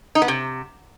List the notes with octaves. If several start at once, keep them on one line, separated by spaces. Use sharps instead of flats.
D#4
B3
C3